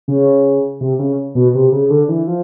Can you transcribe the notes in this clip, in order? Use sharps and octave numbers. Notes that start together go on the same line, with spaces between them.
C#3
C3
C#3
B2
C3
C#3
D3
E3
F3